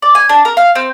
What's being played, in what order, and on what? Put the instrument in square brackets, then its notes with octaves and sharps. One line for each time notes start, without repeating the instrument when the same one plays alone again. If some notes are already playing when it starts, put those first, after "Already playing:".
[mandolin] D5
G#5
D4
A#4
F5
C4